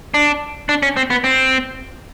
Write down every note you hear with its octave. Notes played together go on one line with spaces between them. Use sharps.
D4
D4
C#4
C4
B3
C4